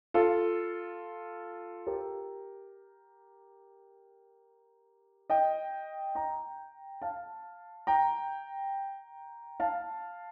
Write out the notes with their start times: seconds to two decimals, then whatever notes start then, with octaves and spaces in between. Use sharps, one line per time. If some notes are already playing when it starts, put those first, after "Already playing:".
0.14 F4 A4
1.87 G4 A#4
5.30 D#5 G5
6.15 G5 A#5
7.02 F5 A5
7.87 G5 A#5
9.60 F5 A5